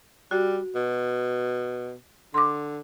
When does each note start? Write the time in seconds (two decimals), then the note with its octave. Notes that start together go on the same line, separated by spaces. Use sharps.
0.31 G3 F#4
0.75 B2
2.34 D3 C6 D6